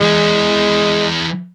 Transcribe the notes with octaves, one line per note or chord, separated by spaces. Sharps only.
E3 G#3 G#4